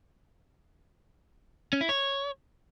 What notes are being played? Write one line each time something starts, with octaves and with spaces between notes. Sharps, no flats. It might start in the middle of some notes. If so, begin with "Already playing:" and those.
C#4
E4
C#5